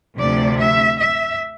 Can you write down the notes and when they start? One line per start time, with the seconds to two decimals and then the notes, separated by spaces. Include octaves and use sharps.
0.17 D2 C3 F3 A3 D5
0.58 E5
0.98 E5